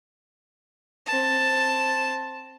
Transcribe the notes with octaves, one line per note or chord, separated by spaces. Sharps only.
C4 A5